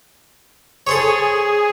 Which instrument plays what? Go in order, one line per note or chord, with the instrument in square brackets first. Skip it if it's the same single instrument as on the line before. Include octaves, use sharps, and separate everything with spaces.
[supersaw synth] G#4 [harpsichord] A4 C5 C#5